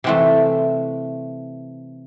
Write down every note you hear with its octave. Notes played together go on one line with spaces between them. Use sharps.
C3 E3 A3 C4